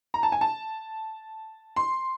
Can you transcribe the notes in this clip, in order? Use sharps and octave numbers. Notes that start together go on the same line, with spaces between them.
A#5
A5
G#5
A5
C6